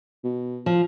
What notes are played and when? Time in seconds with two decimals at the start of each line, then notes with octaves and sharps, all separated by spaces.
0.24 B2
0.66 F3